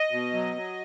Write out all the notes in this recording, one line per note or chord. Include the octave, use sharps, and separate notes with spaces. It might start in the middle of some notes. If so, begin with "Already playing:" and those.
Already playing: D#5
B2
F#3
F#3